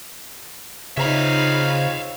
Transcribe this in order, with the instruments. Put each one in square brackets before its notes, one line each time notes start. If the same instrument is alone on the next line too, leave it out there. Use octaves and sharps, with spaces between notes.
[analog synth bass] C#3 [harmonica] C4 F4 C#5 [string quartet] D#4 B5 [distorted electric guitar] E5 F5